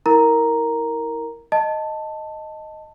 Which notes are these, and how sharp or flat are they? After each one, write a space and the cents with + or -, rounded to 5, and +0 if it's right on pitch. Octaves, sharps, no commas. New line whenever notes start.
E4 -30 A#4 -5 A#5 +0
D#5 +0 A5 +10